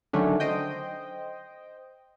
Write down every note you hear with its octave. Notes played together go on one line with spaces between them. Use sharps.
D3 D#3 F#3 A3 C#4 D4
C5 D#5 G5